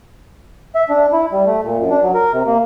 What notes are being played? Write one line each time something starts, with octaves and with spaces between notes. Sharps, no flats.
E5
D4
E4
G3
A3
A#2
F#2
D4
F#3
A#4
C3
A#3